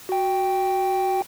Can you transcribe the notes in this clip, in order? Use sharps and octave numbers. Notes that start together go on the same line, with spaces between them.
F#4 G5